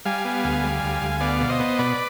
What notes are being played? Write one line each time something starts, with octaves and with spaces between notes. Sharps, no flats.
G3 F5 G#5
B3
D2
G3
D2
D2
B3 D5 F5
B2
C5 D#5
B3
B2 B4 D5